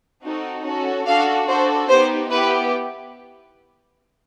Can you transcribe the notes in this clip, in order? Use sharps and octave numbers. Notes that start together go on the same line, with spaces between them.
C4 D#4 F#4 A4
C#4 F#4 A4
D4 F#4 A4 F5
D4 F#4 A4 C5
B3 D#4 G4 C5
B3 E4 G4 B4